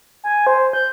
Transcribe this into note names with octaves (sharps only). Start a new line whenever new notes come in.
G#5
C5
G6